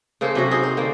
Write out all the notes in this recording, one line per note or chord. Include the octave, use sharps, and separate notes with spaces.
C#3 A#3 A4 C5
C3 F#3 F#4
D#4 G#4 C5
C5
D3 A#3